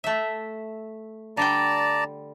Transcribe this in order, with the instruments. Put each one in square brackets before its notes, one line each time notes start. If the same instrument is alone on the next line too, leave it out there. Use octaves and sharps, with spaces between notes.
[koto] A3 E5
[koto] D3 G3 G5 [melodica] D5 A5 A#5